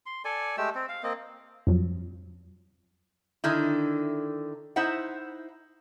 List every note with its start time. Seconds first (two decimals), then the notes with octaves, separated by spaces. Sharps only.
0.06 C6
0.25 A4 D5 G#5
0.58 G#3 A3 G4 E6
0.75 C4
0.89 F5
1.03 A#3 C4 D#5
1.67 F2 F3 F#3
3.44 D3 D#3 E4
4.76 D#4 E4 C5 E5 F#5